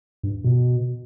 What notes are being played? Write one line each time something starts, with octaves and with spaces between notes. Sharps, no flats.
G2
B2